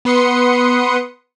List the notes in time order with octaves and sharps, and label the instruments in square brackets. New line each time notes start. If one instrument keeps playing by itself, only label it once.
[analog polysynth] B3 B4 C6 D#6 C#7